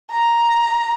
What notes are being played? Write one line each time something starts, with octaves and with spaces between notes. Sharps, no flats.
A#5